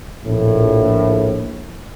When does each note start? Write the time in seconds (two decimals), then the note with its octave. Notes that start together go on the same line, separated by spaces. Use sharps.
0.25 A#1 A2